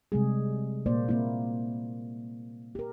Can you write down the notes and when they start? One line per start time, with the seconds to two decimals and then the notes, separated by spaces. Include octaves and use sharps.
0.12 C3 G3 G#3 G#4
0.86 A#2 A#3 C5 D5
1.09 A#3 C4 E4
2.75 G4 A#4